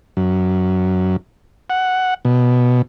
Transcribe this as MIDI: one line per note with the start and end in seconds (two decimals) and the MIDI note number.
0.17 1.16 42
1.70 2.14 78
2.25 2.82 47